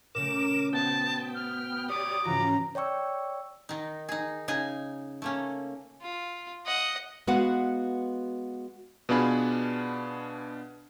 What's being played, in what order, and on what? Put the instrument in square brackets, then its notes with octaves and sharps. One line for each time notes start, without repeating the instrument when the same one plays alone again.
[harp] A#2 C#3 A3 [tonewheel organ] A#4 D6 [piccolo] E7
[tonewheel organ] B3 G5 [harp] F#4 C5 E5 [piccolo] A5
[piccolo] F6
[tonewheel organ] G4 C#5 D5 [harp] B5 [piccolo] D6 [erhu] D#6
[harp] G#2 C#3 E3 [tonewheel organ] F4 F#4 [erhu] A#5
[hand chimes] C#5 D5 G5 C#6 E6
[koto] D#3 D#4
D#4 G#4
C#3 D#4 G#4 G#5
A3 A#3 C#4
[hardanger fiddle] F4
D#5 F#5
[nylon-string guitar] G#3 B3 F#4 B4 F5 F#5
[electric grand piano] B2 B3 D4 F4 G#4 B5